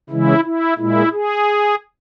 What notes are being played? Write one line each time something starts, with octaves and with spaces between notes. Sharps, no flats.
C#3 E3 G#3 E4
E4
A#2 G#3 E4
G#4